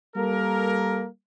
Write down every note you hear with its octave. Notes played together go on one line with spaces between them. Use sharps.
G3 A#3 A4 A#4